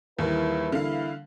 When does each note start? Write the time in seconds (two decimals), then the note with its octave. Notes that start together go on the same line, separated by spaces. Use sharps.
0.19 A#1 D#2 E3 G3 A#3 E4 B4
0.72 D3 E4 F5